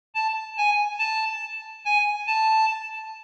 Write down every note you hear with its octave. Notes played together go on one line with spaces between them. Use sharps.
A5
G#5
A5
G#5
A5